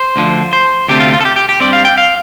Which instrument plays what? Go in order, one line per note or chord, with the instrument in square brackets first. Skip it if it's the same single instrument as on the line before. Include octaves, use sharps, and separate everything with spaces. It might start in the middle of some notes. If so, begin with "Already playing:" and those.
Already playing: [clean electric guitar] C5
D2 D3 F3
C5
D2 C3 A3 C4 G4
F4
F4
A4
G4
G4
G4
G2 G3 C4 D5
F5
G5
F5